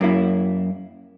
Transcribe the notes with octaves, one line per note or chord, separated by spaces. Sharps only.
F#2 A#3 E4